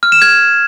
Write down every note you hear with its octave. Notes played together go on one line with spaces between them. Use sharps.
F6
E7
G#6